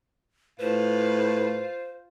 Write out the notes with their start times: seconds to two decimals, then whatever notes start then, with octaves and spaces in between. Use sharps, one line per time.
0.60 A2 F4 B4 C5